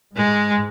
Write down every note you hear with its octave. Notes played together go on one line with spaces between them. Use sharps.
G#2 G#3